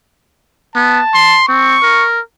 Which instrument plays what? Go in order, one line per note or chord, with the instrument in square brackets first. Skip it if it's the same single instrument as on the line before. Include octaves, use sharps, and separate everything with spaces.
[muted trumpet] B3 [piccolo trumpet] A5
[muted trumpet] C6
[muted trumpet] C4 [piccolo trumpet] C#6
[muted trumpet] A#4